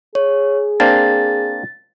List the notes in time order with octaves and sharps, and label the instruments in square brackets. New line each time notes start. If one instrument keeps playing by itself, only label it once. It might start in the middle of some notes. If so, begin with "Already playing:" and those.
[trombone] G#4 [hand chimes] C#5
[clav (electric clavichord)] A#3 C4 D4 [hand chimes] A6